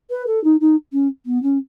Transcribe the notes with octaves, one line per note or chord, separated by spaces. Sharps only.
B4
A4
D#4
D#4
C#4
B3
C#4